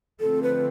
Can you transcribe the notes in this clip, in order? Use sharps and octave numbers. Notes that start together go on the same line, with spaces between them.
D3 F3 A3 C4 A4
B4